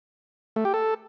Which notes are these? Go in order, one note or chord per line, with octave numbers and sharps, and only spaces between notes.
A3
G4
A4